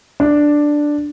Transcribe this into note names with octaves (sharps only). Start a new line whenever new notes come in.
D4